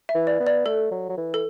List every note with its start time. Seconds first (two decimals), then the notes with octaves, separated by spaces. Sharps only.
0.09 E5
0.15 E3
0.27 D5
0.40 B3
0.47 D5
0.66 A3 A4
0.92 F#3
1.09 F#3
1.17 E3
1.34 A4